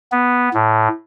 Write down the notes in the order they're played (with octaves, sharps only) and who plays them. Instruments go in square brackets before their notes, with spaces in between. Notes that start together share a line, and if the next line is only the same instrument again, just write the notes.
[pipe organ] B3
A2